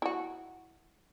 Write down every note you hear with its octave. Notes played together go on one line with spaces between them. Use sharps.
E4 F#4